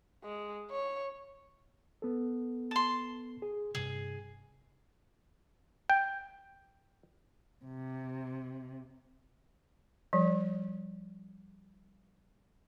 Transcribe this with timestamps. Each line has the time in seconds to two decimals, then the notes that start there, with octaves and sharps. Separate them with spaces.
0.24 G#3
0.71 C#5
2.02 B3 A4
2.71 A5 C6
3.42 G#4
3.75 G2 C3 G#4
5.90 G5
7.65 C3
10.13 F3 G3